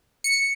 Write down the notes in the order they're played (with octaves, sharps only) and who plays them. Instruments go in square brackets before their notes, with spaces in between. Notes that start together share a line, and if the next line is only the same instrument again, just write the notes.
[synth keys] C#7